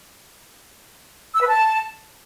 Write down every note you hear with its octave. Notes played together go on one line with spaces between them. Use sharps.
E6
B4
A5